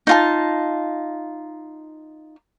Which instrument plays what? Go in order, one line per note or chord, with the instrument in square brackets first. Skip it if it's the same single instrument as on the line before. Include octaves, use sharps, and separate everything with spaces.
[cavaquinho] D#4 F4 A5